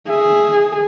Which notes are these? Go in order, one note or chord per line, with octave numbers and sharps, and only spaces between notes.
G#4 E5